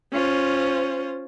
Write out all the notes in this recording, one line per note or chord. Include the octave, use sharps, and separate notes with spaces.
C#4 F4 C5